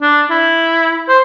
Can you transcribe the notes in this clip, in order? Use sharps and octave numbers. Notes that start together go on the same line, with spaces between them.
D4
E4
C5